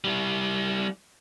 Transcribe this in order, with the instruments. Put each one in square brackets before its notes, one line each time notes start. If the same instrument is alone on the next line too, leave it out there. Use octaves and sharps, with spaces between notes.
[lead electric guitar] G3 E4